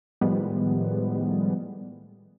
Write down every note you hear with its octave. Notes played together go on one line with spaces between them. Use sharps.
A2 D#3 F3 G3 G#3 B3